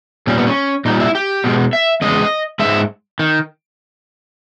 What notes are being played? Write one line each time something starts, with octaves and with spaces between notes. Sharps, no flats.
A#2 G3 C#4
B3
C#4
A#2 G3 D#4
E4
G4
B2 G#3
E5
E2 C#3 G#3 D#5
D#3 G#3 E5
G#2
D#3